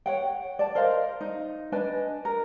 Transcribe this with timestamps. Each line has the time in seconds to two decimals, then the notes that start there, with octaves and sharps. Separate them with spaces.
0.06 C#5 F#5 G5
0.59 D5 A5
0.75 A#4 C5 D#5 F5
1.21 D#4
1.72 D4 B4 D#5 G#5
2.25 A#4